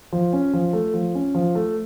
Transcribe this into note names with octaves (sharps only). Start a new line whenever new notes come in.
F3
C#4
F3
A3
F3
C#4
F3
A3